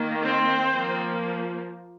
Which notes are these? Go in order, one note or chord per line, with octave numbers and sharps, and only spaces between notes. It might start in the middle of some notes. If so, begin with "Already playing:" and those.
Already playing: D#3 A#3
C4 C5
F3 A#3